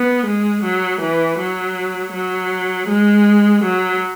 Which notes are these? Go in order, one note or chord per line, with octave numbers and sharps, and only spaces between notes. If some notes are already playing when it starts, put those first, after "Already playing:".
Already playing: B3
G#3
F#3
E3
F#3
F#3
G#3
F#3